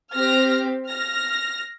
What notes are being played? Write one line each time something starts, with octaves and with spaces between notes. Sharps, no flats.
C4 G4 F6 A#6
F6 A#6